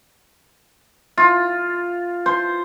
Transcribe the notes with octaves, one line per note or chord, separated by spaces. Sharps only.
F4
C5